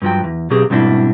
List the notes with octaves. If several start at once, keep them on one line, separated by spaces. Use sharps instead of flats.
G2 F3 F#3 G5
E2
B2 F#3 C4 G4 G#4
G#2 B2 G3 C4 D4 E4